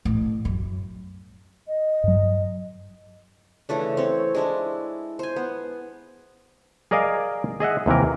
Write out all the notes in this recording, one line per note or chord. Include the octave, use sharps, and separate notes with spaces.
A1
F#2
D#5
G2 F#3
C#3 E3 A3 D4
C4 C#5
G#3 D4 E4
C5 G#5
B3
G#4 A#4 D5 D#5 F5 G#5
G#4 D#5 E5 F#5
D#2 C3 E3 A#4